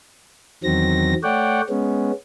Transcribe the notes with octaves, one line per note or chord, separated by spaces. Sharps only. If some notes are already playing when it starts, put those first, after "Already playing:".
E2 D#3 F#3 C4 A#6
A3 C#5 D5 F#5 G5
G#3 B3 C#4